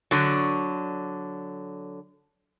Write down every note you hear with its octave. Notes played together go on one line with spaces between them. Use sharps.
D3 F#3